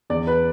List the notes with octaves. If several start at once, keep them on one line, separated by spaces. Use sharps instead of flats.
E2 D5
B4